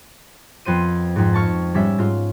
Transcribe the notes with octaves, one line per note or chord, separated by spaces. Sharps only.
F2 B3 C5 D#7
F2 G#2
A5 C#6 F6
G#2 G3 C#4 E5
G#2 F4 F6